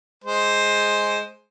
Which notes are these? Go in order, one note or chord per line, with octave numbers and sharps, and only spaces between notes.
G#3 C5